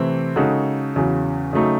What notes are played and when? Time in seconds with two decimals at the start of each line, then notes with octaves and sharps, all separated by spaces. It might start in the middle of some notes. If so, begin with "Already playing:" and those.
Already playing: C3 E3 A3 C4 E4
0.36 C#3 G#3 D#4 F#4 A4
0.95 E2 C#3 F#3
1.53 C#3 F#3 A3 D#4